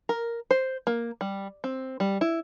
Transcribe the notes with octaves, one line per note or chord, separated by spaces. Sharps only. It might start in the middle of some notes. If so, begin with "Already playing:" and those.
A#4
C5
A#3
G3
C4
G3
E4